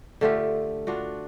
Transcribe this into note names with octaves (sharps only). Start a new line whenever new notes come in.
D3 A3 F4 G4
D4 F4 F#4